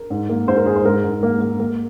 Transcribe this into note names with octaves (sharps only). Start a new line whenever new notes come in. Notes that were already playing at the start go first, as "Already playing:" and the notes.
Already playing: A#4
G#2
A#3
G#2 C5
A#4
G#2 G#4
C5
G#2 A#4
G#2
A#3
A#3
A#3